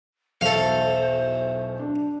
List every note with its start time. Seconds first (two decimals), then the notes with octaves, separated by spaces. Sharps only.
0.41 B1 E2 B2 A4 C5 E5 F5 C#6
1.79 D4